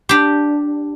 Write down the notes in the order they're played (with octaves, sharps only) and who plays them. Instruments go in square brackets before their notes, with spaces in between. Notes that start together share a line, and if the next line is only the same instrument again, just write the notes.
[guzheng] D4 G4